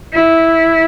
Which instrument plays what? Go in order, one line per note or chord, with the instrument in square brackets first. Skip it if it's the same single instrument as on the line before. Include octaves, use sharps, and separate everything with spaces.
[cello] E4